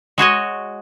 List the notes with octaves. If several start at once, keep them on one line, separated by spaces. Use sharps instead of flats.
G#3 F#4 C#5 D#5